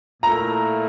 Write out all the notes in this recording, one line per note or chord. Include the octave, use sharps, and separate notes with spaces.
A#2 A3 E4 A#5